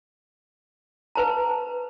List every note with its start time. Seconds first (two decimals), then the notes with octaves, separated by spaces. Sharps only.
1.15 B4 C5 A5 A#5